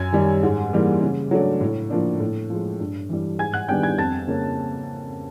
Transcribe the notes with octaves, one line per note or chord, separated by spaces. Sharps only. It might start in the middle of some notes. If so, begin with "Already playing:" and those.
Already playing: F#2 G#5 G#6
D#3 G3
G#2
E3 G3 A#3
C#3
F#3 A3 D4
A2
F3 A#3 D4
A2
F3 G#3
G2
E3 G3
G#2 G#5 G#6
F#5 F#6
D#3 G3 B3 D4 G5 G6
G#5 G#6
F2 A5 A6
C#3 A#3 C#4